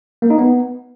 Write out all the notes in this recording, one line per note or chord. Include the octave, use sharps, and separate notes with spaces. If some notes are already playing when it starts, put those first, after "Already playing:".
A#3
D#4
B3